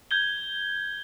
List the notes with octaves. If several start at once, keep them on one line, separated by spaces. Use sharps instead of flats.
G6 G#6 G7